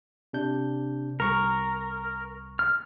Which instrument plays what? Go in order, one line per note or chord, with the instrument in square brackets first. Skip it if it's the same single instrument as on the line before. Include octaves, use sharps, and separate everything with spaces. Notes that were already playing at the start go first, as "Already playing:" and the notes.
[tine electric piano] C3 D4 G6
[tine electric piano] C2 C#6 [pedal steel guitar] A#4
[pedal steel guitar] F6